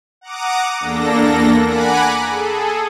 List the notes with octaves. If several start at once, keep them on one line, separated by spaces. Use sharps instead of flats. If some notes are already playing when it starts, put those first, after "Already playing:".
F#5 A#5 D6 D#6
E2 A#3 D4 A4 A#6
F#5 G#5 A#5 B5 D6 F#6
G#4 A4